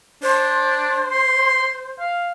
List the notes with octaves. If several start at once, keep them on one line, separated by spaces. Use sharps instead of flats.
D4 C5
C6
F5